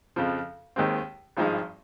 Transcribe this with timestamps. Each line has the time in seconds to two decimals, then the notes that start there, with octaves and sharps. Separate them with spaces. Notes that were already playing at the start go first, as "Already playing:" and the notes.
0.16 F2 C#3 F3
0.76 D#2 D#3 G#3 C4
1.37 G#1 G2 F3 G#3 D#4